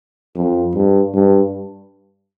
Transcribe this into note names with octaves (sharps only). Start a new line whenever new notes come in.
F2
G2
G2